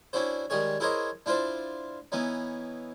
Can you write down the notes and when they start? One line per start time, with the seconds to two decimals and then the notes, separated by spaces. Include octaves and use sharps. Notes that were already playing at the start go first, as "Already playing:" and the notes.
0.13 C#4 D4 E4 F#4 C5
0.50 D#3 G3 G#3 G#4 C#5
0.80 E4 G#4 A#4 C5 C#5 D#5
1.26 D4 E4 F4 C5 A5
2.12 E3 B3 C#4 D#4